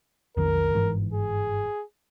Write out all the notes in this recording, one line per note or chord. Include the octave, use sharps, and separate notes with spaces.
B1 F2 D#3 A#4
G1 G#2 E3
G#4